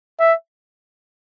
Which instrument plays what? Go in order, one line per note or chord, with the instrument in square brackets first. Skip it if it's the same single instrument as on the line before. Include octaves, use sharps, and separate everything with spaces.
[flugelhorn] E5